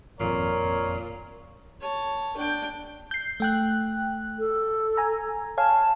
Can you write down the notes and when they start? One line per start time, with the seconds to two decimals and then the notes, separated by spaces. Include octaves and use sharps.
0.20 G#1 F2 A#2 A#4 C#5
1.81 C#5 A5
2.37 D4 G5
3.11 G6 C7
3.40 A3 G5 F#6
4.39 A4
4.97 G#5 A#5
5.58 C#5 F5 G#5 A5